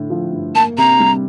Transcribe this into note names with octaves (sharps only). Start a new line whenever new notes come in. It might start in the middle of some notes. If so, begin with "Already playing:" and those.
Already playing: A2 D3
F3
G2
A#3 A5
C3 A#5
G3